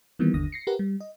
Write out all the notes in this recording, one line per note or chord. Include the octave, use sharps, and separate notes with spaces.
D#3 E3 G3 A#3 B3
G1 D#2 D3 D#6 A#6
A#6 C7 C#7
G4 A#4 B4 F#5
G3
D#5